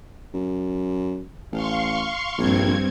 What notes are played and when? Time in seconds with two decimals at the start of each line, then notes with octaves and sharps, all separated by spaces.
0.34 F#2
1.52 A1 F5 C6 C#6
2.38 A#1 G2 C4 G#6